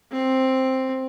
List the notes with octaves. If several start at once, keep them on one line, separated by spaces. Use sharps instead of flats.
C4